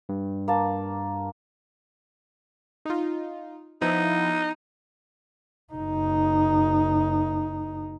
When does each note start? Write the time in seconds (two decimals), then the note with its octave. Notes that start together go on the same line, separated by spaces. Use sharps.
0.09 G2
0.48 A#3 A5
2.85 D#4 F4
3.81 F3 B3 D#4 E4
5.73 F#1 D#4